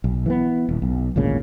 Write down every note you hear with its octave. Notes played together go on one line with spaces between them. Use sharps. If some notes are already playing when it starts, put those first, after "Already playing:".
B1
E3 A3 B3
D#1
B1
G#1 D2 A#2 C#3